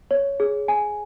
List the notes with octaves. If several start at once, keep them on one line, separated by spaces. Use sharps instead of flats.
C#5
G#4
G#5